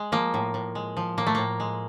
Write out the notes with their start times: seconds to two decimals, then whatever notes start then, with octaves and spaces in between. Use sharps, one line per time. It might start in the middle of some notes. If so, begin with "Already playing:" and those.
Already playing: G#3
0.12 F3 A#3
0.34 A2
0.54 A2
0.75 G#3
0.97 F3
1.17 A2 A#3
1.27 A3
1.35 A2 A#3
1.60 G#3